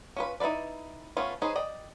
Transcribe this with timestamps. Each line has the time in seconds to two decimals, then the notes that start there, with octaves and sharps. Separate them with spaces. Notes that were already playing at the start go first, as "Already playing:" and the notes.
0.16 C#4 F4 B4
0.40 D#4 E4 A4 B4 D5
1.17 A3 B3 C#4 F4
1.42 C#4 D#4 G#4 B4 C5
1.55 D5 D#5 G5